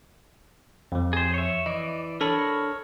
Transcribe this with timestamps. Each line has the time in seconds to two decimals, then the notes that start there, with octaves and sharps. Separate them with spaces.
0.92 F2 F3
1.13 G#4 C5
1.34 C#5 E5
1.66 E3 D5 D#5
2.21 D4 A4 A#4 C#5 A5 B5